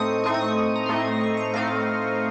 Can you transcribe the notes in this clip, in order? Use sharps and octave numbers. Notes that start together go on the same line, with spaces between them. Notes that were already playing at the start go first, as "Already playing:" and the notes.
Already playing: A2 A3 C4 D#4 C#6 D#6
A2 A3 C4 D#4 C#6
D#6
C#6
A#5
A2 A3 C4 D#4 C6
C#6
D#6
C#6
A#5
A2 A3 C4 D#4 F5